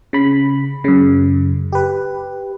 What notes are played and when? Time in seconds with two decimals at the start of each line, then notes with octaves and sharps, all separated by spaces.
0.13 C#3 B5
0.84 F#2 C#3
1.73 G4 B4